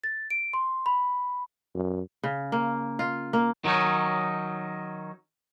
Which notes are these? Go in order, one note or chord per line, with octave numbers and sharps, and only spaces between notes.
A6
D7
C6
B5
F#2
C#3
A#3
F4
A#3
D#3 F#3 G3 C#4 D#4